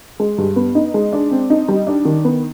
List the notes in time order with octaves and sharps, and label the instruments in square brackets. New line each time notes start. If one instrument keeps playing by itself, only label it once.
[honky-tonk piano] G#3
G2
B3
D#4
G#3
D4
C4
D#4
G3
D4
D#3
B3